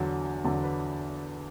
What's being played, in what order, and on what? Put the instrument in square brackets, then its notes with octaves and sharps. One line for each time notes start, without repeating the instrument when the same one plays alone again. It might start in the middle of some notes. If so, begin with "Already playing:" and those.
Already playing: [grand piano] E2 D3 F#3
E2 D3 F#3
B4